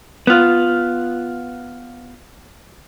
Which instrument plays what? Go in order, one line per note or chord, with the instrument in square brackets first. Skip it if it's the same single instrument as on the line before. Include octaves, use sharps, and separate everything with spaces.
[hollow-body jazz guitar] B3 F4